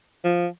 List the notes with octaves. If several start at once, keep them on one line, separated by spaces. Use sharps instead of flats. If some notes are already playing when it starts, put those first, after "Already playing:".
F3